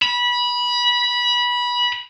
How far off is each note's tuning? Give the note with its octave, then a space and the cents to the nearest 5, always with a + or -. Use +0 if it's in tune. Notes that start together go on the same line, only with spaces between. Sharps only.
B5 -20